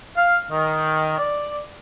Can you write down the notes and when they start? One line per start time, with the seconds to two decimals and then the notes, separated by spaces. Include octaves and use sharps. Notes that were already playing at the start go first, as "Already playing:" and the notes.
0.17 F5
0.51 D#3
1.18 D5